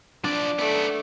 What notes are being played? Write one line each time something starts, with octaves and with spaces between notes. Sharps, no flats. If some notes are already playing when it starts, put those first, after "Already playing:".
F3 D4 D5
A3 B3 D5